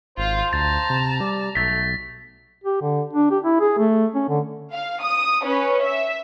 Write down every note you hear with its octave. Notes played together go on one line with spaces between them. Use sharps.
G#1 F4 C5 F5
D2 A5 A#5 A6
C3
G3 D5
B1 A3 A6 B6
G4
D3
D4
G4
E4
G#4
A3
C#4
D3
F5
D#6
C#4 B4
E5